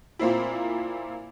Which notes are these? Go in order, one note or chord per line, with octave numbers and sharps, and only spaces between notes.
A#2 A#3 C4 E4